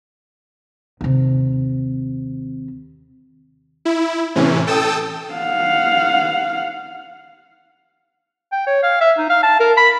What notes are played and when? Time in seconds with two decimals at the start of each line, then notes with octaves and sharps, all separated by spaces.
1.01 D#2 C3
3.85 E4
4.35 A2 C3 E3 C#4
4.67 A4 G5 A5 D#6 E6
5.34 F5 F#5
8.52 G5
8.67 C#5
8.83 F5
9.01 E5
9.18 D#4
9.30 F5
9.43 A5
9.60 A#4
9.77 B5